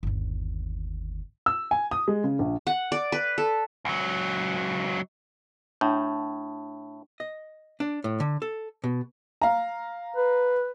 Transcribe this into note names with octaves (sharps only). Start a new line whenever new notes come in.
G1 D#2
E6
G#5
D#6
G#3
C#3
A#1
F#5
D5
B4
A4
C#2 F#3
A2 D4
D#5
D4
A2
D3
A4
B2
F5 A#5
B4